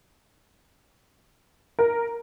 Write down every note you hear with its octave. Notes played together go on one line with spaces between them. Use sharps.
A#4